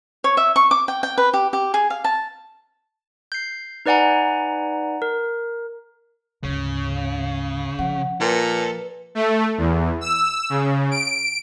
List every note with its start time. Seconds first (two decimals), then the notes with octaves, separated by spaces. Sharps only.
0.24 C#5
0.37 E5
0.56 C#6
0.71 D6
0.88 G5
1.03 G5
1.18 B4
1.34 G4
1.53 G4
1.74 G#4
1.90 F5
2.04 A5
3.32 G6 C7
3.86 D#4 B4 D5 F#5 G#5 A#5
5.02 A#4
6.44 D2 G#2 C#3
7.79 F3 F#5
8.21 A#2 A4 B4
9.15 A3
9.58 E2
10.01 E6
10.50 C#3
10.91 D7